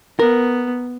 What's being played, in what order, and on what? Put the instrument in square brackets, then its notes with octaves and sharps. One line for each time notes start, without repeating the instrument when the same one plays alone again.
[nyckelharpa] B3 [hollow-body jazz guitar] A#4